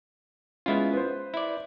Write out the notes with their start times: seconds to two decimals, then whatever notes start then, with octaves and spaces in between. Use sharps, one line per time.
0.66 G#3 B3 C#4 E4 F4
0.93 B4 C5
1.34 E4 D5